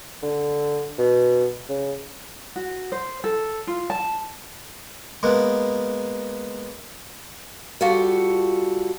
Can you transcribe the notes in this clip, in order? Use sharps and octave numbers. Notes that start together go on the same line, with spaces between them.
D3
B2
C#3
F#4
C5
A4
F4
A5
G#3 A#3 B3
G3 F4 F#4 A4